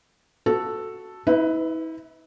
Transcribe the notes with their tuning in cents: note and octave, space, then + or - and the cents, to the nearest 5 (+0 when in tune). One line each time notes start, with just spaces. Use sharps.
F#4 +0 A4 +0
E4 -45 B4 +15 E5 +5